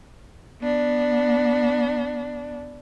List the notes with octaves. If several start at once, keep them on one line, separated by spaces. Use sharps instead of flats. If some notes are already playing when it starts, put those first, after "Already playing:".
B3 D4